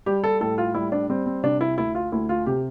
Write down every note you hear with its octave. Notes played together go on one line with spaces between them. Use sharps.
G3 G4
A4
A2 A4
F4
G3 E4
D4
G3 C4
C4
C3 D4
E4
D2 E4
F4
D2 E4
F4
C3 G4